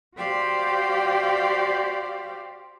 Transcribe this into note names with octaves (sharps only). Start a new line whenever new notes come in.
F#4 G4 C5 D5 F5 G5